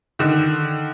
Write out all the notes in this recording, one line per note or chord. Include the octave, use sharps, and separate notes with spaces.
D3 D#3